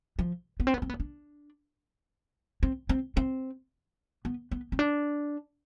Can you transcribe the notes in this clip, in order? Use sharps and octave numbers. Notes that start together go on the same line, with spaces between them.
F3
B3
C4
B3
C4
B3
D4
C4
C4
C4
B3
B3
C4
D4